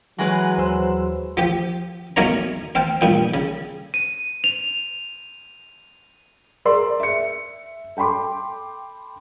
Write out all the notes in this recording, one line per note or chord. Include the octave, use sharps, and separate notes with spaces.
E3 F#3 G#3 B4 F#5 A#6
D#2 C5 E6
F3 G4
B1 B2 A#3 A#4 C#5 A#5
C4 F5 G5 A5
G2 A#2 G5
C#3
D#7
F7
G#4 A#4 D5 C6 E6
E5 C#7
A4 G5 B5 C6 D6